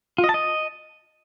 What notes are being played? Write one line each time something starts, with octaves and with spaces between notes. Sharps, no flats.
F4
D#5
A5
D#5